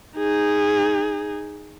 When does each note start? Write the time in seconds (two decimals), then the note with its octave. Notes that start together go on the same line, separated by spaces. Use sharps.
0.17 D#4 G#4